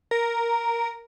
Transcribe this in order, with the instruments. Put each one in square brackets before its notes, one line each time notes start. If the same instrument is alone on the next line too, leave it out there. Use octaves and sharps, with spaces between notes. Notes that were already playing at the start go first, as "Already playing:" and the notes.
[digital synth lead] A#4